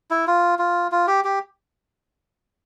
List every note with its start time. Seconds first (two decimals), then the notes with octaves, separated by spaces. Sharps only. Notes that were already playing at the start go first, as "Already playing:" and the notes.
0.11 E4
0.27 F4
0.59 F4
0.92 F4
1.07 G4
1.24 G4